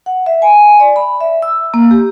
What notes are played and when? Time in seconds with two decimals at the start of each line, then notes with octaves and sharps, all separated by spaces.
0.06 F#5
0.26 E5
0.42 G#5
0.80 D5
0.96 B5
1.21 E5
1.42 E6
1.74 A#3
1.91 G4